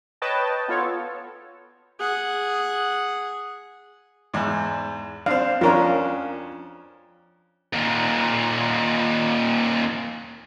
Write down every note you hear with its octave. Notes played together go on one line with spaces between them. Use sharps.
B4 C#5 D#5 G5 A5
B3 F4 A4 C#5
G#4 F#5
E2 G#2
C4 D4 F5
F2 C#4 D4 F4 A#4
D#2 A#2